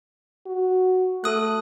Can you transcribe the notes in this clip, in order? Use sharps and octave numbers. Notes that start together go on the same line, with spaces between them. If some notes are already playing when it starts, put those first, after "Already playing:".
F#4
A3 A4 D#6 F#6